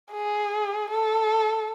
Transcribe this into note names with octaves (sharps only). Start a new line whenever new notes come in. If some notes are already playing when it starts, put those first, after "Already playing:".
G#4
A4